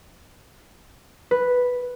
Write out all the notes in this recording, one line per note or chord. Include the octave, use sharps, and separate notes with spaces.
B4